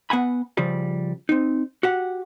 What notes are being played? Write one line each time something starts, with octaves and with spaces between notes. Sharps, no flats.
B3 F#5 G#5 B5
C#3 F3 G3
C4 D#4
F#4 G4 F#5